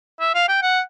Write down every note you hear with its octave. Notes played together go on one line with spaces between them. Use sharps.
E5
F5
G5
F#5